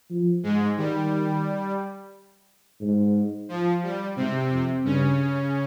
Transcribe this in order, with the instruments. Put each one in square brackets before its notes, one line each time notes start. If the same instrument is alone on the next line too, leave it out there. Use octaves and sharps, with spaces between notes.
[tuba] F3
[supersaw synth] G#2 G#3
[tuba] D#3 [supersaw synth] G3
[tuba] G#2
[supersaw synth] F3
G3
[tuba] G#2 [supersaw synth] C3 C4
[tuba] F2
[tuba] G2 [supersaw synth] C#3 C#4